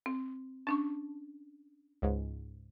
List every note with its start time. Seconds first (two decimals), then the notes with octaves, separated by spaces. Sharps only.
0.06 C4
0.67 C#4 D4 A5 C#6
2.02 C#2 G#2